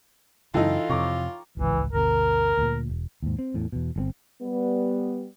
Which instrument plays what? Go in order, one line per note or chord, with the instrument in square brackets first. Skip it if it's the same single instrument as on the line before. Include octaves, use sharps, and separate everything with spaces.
[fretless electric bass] F#2 C#3 [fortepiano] E3 D#4 [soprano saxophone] F4 [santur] A4 G5
[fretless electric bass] F2 C3 [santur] C#5 A#5 D6
[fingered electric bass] D1 G#1 C#2 [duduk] E3
[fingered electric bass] G1 D2 B2 [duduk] A#4
[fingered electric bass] D2 A#2
E1
[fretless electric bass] D#2 G#2
C4
E2 A2
E2 B2
G1 D3 C4
[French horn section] G3 B3